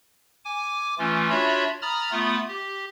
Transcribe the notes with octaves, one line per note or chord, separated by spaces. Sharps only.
G#5 D6
E3 A3 C#4 F4
D4 F4 F#4 C#5 E5 B5
A#5 B5 D#6 F6 A6
A3 B3 F4 B5 D#6
G4